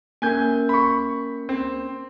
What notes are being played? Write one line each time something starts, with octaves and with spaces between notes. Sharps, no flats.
A#3 C#4 A#4 G#5 G6
B5 C#6
C4